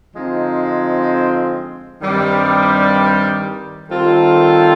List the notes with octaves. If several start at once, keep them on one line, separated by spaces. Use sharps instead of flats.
D3 F3 G#3 C4 D#4
G2 D#3 G3 C4
D#3 G3 C4 F4 A4